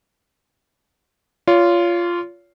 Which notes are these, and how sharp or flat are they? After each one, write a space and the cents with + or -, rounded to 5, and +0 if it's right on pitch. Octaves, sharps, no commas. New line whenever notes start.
F4 -10 C#5 +35